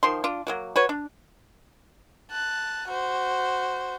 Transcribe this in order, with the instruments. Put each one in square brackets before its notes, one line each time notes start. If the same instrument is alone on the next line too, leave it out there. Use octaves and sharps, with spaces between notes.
[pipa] D#3 F3 C6
D4 F4
F#3 A#3 F#4
F#4 B4 C#5
D4
[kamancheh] A5 F#6
F#4 C5